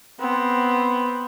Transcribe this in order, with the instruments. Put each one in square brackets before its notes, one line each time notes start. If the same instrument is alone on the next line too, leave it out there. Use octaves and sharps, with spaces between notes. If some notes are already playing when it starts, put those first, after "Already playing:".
[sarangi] B3 [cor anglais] C4